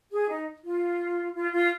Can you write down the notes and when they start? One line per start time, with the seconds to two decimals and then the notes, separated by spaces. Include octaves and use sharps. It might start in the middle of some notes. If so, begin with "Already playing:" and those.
0.12 G#4
0.29 D#4
0.64 F4
1.35 F4
1.52 F4